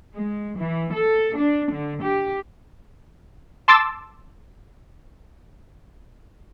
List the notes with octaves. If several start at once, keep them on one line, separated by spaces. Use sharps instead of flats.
G#3
E3
A4
D4
D3
G4
A5 C6 D6 E6 A6